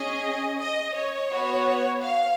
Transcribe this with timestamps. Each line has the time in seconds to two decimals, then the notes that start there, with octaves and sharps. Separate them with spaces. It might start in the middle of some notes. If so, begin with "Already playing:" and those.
Already playing: C#4 G#4 D#5
0.59 D#5
0.94 C#5
1.30 B3 F#4
2.02 F5